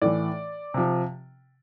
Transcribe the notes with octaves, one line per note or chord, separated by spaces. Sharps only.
A2 E3 D5
C3 F3